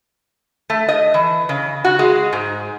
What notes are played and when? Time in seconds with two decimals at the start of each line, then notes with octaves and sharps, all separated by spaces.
0.70 A3
0.89 D#5
1.14 E3
1.49 C#3
1.85 F#4
1.99 G#3
2.33 G#2